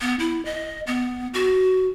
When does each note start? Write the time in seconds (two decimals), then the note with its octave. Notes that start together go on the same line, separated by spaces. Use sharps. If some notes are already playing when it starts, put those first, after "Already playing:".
0.01 B3
0.19 E4
0.45 D#5
0.87 B3
1.34 F#4